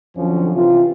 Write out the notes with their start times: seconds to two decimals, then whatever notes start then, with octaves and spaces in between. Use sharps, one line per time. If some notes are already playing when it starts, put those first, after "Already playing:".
0.16 F2 D3 F3 F#3 C#4
0.54 C3 E3 F4